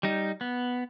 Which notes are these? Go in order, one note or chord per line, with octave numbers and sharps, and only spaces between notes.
G3 D#4
B3